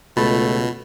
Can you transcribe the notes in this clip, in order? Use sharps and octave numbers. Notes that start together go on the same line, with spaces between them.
C#2 B2 A3 F4 B5 A6